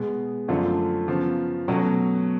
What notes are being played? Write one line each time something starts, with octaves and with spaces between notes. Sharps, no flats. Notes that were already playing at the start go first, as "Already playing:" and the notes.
Already playing: B2 G#3 B3
F#2 D3 F3 A3 F4
C#3 F3 B3
B2 F#3 A3 C#4